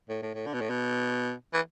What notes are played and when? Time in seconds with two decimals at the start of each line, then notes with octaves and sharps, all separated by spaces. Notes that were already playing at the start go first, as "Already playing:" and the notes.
0.09 A2
0.22 A2
0.35 A2
0.47 D3
0.54 B2
0.61 A2
0.70 B2
1.54 E3